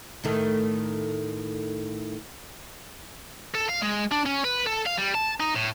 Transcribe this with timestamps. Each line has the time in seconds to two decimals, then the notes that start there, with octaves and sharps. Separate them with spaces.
0.24 A2 D#3 A3
3.55 A4
3.69 F5
3.82 G#3
4.12 D4
4.26 C#4
4.44 B4
4.66 A4
4.86 F5
4.97 G3
5.14 A5
5.40 D#4
5.55 A2